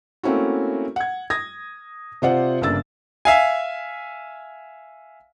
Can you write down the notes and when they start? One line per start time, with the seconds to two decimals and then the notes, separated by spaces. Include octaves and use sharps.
0.23 A3 A#3 C4 C#4 E4 F#4
0.96 F#5 G#6
1.30 D#6 G#6 A#6
2.22 C3 F4 C5 D5 F#5
2.61 G1 C#3 A#3 D4 E6 A6
3.25 E5 F5 G#5